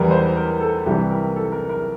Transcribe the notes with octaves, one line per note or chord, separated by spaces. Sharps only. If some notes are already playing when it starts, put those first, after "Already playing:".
Already playing: E2 E3 G3 A#4
C5
A#4
A4
C2 C3 E3 G3 G4
A#4
A4
A#4
A#4